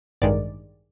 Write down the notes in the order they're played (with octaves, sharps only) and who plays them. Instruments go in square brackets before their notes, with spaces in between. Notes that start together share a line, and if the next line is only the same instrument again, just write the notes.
[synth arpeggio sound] A1 G2 D#3 G#3 D5